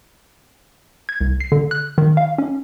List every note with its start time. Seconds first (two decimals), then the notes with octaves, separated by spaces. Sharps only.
1.09 G#6
1.21 C2
1.40 C7
1.52 D3
1.71 F#6
1.98 D#3
2.17 F5
2.38 C#4